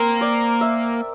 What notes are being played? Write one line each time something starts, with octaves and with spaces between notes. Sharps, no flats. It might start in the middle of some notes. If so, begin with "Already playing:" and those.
Already playing: A#3 C4 A#4
D5
E5